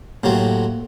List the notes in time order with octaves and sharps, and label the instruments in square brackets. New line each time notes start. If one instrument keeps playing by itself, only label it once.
[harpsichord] A2 C3 F#3 [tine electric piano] A#3